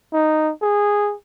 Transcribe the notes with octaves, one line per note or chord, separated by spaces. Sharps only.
D#4
G#4